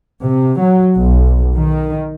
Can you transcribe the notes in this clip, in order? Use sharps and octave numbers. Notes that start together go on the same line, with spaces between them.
C3
F#3
B1
D#3